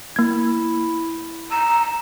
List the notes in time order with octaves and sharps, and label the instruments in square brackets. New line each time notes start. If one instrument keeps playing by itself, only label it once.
[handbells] A#3 G#6 [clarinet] E4
[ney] A#5 [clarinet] E6